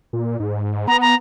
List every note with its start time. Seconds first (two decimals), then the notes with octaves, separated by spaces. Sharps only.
0.13 A#2
0.40 G#2
0.88 B3 A#5
1.02 A#5